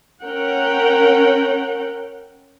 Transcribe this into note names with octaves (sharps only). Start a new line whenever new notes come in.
C#4 A#4 F#5 G5